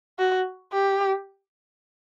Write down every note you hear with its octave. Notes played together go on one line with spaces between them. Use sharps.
F#4
G4